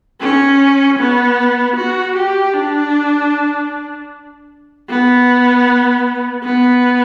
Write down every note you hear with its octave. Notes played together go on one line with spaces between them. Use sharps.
C#4
B3
F#4
G4
D4
B3
B3